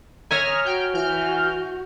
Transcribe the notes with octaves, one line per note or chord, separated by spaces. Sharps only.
C#5 E5 G#5 A#5 D#6 F6
F#4 G5 F6 G6
E3 F6 G6